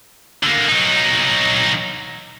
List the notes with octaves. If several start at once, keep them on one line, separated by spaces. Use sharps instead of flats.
D3 A#3
F#3 D#4